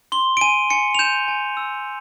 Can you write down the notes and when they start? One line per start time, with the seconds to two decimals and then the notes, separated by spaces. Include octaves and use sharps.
0.12 C6 G7
0.37 D7
0.41 G#5 D#7
0.70 G#5 C#7
0.95 F7
0.99 G6 E7
1.28 G#5
1.57 E6